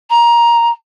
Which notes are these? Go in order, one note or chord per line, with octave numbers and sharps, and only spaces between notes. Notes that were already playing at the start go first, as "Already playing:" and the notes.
A#5